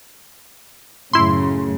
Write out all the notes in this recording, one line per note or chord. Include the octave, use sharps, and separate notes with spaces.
F#2 A2 C#3 E4 C6